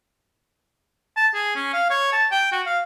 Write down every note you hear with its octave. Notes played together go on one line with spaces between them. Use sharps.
A5
G#4
C#4
F5
C#5
A5
G5
F#4
F5